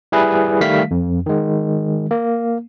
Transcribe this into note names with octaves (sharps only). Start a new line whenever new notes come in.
G3 E4 G#4 B4
D#3 G3 A3 F5 B6
F2
D#3 G#3
A#3